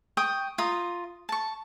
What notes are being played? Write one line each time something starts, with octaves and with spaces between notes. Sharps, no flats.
G5 C#6 D#6
F4 A#5 D#6
A5 C#6